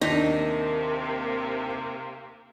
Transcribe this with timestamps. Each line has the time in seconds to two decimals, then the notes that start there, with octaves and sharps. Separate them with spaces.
0.01 D#2 C3 A#3 D4 D#4 B6